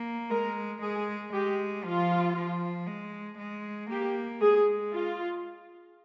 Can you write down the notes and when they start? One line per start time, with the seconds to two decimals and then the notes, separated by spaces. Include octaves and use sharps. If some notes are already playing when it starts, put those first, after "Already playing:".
Already playing: A#3
0.30 G#3 A#4
0.81 G#3 G#4
1.32 G#3 G4
1.84 F3 F4
2.36 F3
2.87 G#3
3.38 G#3
3.89 A#3 G4
4.41 G#3 G#4
4.93 F4